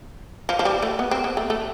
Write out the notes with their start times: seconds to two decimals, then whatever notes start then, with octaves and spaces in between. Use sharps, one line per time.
0.49 F3
0.59 F3
0.65 G3
0.82 A3
0.99 B3
1.11 C4
1.24 B3
1.37 A3
1.50 A3